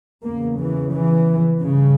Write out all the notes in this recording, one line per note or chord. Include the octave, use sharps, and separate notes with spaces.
E2 C#3 A#3
E3
E3
G2 C#3